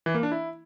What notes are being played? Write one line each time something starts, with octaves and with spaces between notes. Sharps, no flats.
E3
A#3
D4
E4